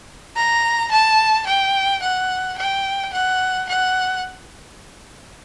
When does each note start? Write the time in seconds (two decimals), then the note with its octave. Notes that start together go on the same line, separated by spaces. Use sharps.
0.36 A#5
0.91 A5
1.47 G5
2.02 F#5
2.58 G5
3.13 F#5
3.69 F#5